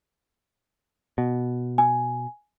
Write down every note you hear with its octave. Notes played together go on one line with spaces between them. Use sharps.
B2
G#5